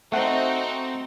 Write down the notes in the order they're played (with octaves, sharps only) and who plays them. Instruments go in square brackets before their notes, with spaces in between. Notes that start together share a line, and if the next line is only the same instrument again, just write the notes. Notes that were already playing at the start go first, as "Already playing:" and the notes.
[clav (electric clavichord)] A3 F#5 [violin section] C4 D#4 F#4